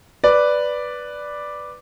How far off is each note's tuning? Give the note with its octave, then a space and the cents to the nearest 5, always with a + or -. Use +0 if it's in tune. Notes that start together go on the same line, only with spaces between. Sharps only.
B4 +0 D5 +0